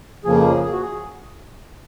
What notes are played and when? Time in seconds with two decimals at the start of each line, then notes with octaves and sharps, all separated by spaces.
0.25 F2 C#3 F3 A#3 G#4
0.62 G#4
0.72 F#4
0.81 G#4